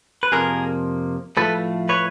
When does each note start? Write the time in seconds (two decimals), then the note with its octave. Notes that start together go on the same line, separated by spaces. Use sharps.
0.23 B4
0.32 F2 C3 F3 A#3 G#4 A#4
1.37 A2 F3 A3 A4 B4
1.89 B4 C#5